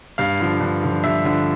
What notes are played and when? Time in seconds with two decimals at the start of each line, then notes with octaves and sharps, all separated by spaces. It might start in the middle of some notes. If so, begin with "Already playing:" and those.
0.18 G2 F5
0.40 D3 F3
0.61 G2
0.83 D3 F3
1.04 G2 E5
1.25 D3 F3